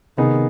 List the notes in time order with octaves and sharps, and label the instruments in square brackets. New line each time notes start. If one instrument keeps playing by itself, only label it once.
[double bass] C3 [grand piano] D#3 B3 D#4 G#4